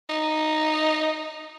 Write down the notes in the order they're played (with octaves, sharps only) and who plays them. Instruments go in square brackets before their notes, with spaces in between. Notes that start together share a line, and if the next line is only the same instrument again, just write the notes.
[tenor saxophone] D#4